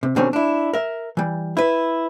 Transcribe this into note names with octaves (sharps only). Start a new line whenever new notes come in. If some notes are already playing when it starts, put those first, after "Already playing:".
C3
B2 D3 D#3 G3 C4 C#4
D4 E4
A#4 E5
E3 G3
E4 B4